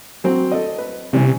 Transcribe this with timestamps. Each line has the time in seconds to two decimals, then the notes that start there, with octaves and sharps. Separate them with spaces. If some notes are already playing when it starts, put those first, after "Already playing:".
0.24 F#3 C4
0.52 A4 D#5
0.78 B4
1.13 C3 E3 G3 C#4